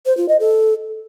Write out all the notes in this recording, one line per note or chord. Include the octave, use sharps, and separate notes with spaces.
C5
F4
D#5
A4